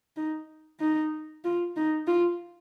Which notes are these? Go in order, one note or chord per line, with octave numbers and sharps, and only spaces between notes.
D#4
D#4
F4
D#4
F4